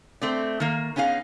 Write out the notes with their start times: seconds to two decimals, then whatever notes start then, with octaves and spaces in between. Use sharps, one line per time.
0.21 A3 C4 D5
0.60 D#3 A#3
0.96 B3 C#4 D#4 G#4 F5